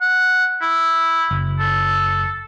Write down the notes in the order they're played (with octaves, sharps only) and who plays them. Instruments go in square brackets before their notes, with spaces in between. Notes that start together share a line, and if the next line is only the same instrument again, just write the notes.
[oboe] F#5
E4
[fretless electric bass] F#1
[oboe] A4